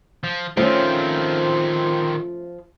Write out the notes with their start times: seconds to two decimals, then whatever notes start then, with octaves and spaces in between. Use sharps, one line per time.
0.24 F3
0.57 D#3 F3 A3 C4 C#4